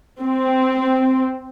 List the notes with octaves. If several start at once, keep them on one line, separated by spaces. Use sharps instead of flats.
C4